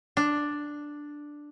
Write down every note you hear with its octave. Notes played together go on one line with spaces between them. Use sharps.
D4